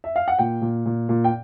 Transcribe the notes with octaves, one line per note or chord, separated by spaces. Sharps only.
E5
F5
F#5
A#2 G5
A#2
A#2
A#2
G5